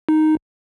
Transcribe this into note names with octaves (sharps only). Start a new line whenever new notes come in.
D#4